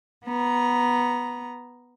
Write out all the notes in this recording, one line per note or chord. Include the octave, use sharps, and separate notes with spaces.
B3 A#5